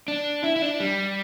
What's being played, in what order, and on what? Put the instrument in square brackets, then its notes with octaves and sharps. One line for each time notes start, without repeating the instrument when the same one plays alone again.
[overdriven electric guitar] D4
E4
E4
D4
G3